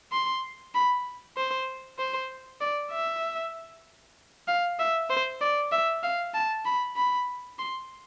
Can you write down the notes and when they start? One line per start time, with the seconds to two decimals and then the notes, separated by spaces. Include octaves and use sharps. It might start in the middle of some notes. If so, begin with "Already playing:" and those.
0.12 C6
0.74 B5
1.37 C5
1.99 C5
2.61 D5
2.92 E5
4.48 F5
4.79 E5
5.10 C5
5.41 D5
5.72 E5
6.03 F5
6.34 A5
6.65 B5
6.96 B5
7.59 C6